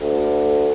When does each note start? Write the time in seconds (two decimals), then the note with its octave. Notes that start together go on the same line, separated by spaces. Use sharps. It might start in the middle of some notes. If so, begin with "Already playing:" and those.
0.01 D2